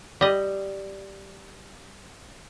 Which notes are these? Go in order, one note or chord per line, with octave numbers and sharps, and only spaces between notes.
G3 D#5